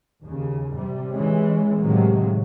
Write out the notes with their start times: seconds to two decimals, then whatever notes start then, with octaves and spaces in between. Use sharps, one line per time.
0.22 D#2 C#3
0.76 C3 G3
1.11 E3 G#3 C#4
1.78 A2 C3 D#3 F#3 G#3 A#3